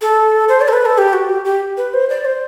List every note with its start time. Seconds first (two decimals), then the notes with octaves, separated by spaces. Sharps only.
0.01 A4
0.49 C5
0.61 D5
0.68 A4
0.73 B4
0.85 A4
0.98 G4
1.13 F#4
1.29 G4
1.45 G4
1.77 B4
1.93 C5
2.10 D5
2.25 C5